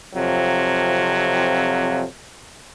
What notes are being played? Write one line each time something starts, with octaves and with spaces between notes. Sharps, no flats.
F2 C3 F3 F#3